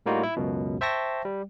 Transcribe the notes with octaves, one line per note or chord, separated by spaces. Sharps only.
A2 G3 A#3 D#4 F4 F#4
E4
C#2 F#2 B2
C5 E5 G5 A5 C#6 A#6
G3